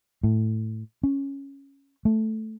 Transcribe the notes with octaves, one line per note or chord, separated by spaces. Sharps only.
A2
C#4
A3